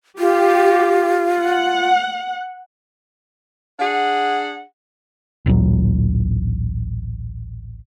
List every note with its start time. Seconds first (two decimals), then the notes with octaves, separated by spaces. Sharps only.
0.19 F4 G4
1.39 F#5
3.79 D4 G#4 F#5
5.46 A1 D2 A#2 F#3